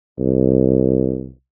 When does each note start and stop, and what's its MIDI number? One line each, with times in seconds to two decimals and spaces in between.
0.19 1.28 36